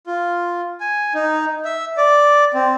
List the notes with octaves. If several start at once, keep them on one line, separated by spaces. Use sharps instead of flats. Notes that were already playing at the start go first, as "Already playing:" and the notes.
F4
G#5
D#4
E5
D5
C4